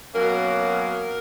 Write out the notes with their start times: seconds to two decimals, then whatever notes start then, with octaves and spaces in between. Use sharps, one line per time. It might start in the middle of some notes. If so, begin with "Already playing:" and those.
0.14 B2 F#3 A#3 C#4 A#4